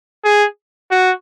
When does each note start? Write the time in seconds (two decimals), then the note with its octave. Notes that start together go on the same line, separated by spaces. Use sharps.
0.25 G#4
0.91 F#4